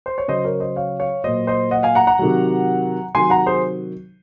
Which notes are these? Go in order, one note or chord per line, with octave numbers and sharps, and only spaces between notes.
C5
C#5
C#3 F#3 C5 D#5
A#4 C#5
C5 D#5
C#5 F5
C#5 F5
A#2 F#3 C5 D#5
C5 D#5
D#5 F#5
F5 G#5
F#5 A#5
F#5 A#5
C3 D#3 F#3
C3 D#3 F#3 G#5 C6
F#5 A#5
G#4 C5